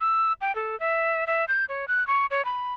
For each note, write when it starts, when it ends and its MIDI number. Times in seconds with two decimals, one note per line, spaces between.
0.01 0.33 88
0.41 0.55 79
0.55 0.78 69
0.80 1.25 76
1.27 1.45 76
1.48 1.65 91
1.69 1.85 73
1.88 2.06 90
2.07 2.26 85
2.31 2.44 73
2.45 2.74 83